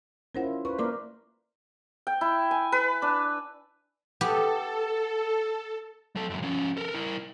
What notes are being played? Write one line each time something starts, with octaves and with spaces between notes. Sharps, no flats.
C#4 E4 F4 A#4 C5 F#5
B4 C5 C#6
A#3 A#4 B4 D5 C6 D6
G5
E4
G#5
B4
D4
B3 G4 A4
F#3 A4
C#2 F#2
F3 C#4
A4 A#4
E4 A#4